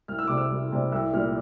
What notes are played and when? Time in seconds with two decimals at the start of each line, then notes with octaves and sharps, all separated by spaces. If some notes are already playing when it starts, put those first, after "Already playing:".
0.08 C2 F6
0.19 E6
0.27 C3 G3 D6
0.37 E6
0.51 C2
0.72 C3 G3
0.92 C2 E6
1.13 A#2 G3 F6